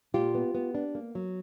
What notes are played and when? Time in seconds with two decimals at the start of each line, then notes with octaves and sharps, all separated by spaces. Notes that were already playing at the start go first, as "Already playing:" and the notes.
0.14 A#2 F4 G4
0.35 B3
0.55 B3
0.75 D4
0.95 A#3
1.15 F#3